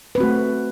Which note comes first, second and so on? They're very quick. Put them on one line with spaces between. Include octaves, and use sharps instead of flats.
B4 C4 F#4 A3